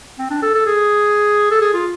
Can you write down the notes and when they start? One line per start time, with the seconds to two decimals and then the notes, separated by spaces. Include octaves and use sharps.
0.19 C4
0.30 D4
0.43 A4
0.54 A4
0.66 G#4
1.51 A4
1.61 G#4
1.73 F4